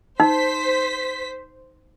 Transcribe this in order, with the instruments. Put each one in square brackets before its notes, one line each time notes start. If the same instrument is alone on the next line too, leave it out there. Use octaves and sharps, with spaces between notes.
[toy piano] D#4 [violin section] C5 B6